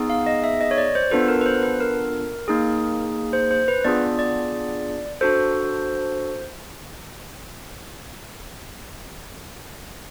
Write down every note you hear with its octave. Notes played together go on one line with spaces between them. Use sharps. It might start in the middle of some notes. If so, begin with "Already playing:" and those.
Already playing: B3 D#4 G#4
F5
D#5
E5
D#5
C#5
D5
C5
B3 D4 F4 A4 B4
A#4
B4
C5
B4
A#4
A#3 D#4 G#4
C5
C5
B4
B3 D4 F4 G#4 D5
D5
D4 F#4 A4 C5